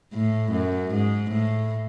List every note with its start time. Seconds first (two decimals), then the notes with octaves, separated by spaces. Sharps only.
0.13 A2
0.52 F#2
0.92 G#2
1.31 A2